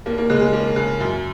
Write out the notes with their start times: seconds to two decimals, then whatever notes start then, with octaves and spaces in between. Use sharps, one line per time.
0.06 D#2 A#3
0.18 A#3
0.30 C#3 G#3
0.41 G#3
0.53 D#2 A#3
0.76 C#3
1.00 F#2